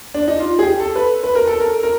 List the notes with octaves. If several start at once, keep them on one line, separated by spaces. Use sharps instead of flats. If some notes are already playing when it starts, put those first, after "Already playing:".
D4
D#4
F4
G#4
G4
A4
B4
B4
A#4
A4
A#4
A#4